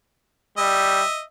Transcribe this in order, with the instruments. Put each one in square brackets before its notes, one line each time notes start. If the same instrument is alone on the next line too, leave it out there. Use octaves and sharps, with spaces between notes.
[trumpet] G3 [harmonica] D#5 E5